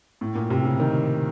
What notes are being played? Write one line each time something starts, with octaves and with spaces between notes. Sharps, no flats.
A2
A#2
C3
C#3
D#3